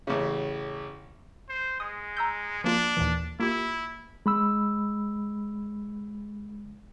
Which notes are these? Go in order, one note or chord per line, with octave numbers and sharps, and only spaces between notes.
A1 C#3
C5
G#3 D#6
A#5 E6 G6
F3 A#3 D4 F4
D#2 A#2 E3
A#3 E4 F4 G4
G#3 B5 E6